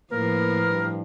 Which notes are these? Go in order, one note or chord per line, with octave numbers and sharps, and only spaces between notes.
A2 F3 A#3 A#4 B4
G2